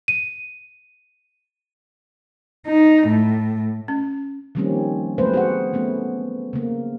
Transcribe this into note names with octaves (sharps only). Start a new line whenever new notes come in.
D#7
D#4
A2
C#4
D#3 F3 G3 A#3 C4 C#4
F#3 A3 B3 C4 B4 C5
F#4 G#4 F#5
E3 A3 B3 C#4
C#3 A#3